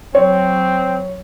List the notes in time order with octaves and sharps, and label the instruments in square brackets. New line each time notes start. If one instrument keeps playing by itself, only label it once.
[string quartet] F#3 [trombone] C4 [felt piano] C#5